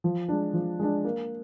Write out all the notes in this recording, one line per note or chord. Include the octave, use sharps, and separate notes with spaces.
F3
G#3 D4
F3
G#3 D4
A#3